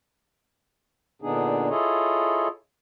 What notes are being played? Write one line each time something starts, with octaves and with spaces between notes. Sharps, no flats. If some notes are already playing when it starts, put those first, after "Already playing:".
A#2 D3 B3 D4 D#4 G#4
E4 F4 G#4 A4 C#5 D#5